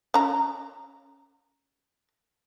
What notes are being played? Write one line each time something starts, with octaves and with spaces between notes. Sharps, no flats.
C#4 A#5